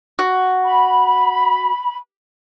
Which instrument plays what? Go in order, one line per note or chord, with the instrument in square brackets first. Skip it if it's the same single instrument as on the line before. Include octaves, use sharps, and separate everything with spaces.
[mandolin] F#4
[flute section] B5